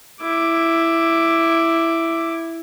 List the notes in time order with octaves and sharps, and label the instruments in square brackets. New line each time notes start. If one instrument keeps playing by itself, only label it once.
[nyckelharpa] E4 D6